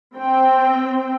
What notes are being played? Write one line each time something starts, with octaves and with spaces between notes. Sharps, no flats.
C4 G5